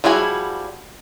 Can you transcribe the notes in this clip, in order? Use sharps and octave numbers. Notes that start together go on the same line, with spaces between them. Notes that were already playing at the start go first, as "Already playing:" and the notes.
F3 G3 E4 F#4 G#4